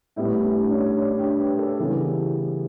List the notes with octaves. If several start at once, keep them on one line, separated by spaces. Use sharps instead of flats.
A2 G3 B3 E4
D4
C#4
D4
G4
B4
A4
C#3 E3 G3 B3 E4